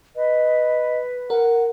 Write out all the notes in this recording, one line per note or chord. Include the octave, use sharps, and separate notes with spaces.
B4 D#5
A#4 F#5